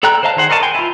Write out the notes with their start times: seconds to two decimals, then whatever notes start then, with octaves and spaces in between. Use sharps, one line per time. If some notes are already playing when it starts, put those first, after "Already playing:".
0.03 A4 D5 G5 A#5 F#6
0.23 C5 D5 D#5 F5 A5
0.36 D#3 G#4 C5 F#5
0.50 A#4 C#5 D#5 A5
0.63 G5 G#5 C6
0.75 E4 F4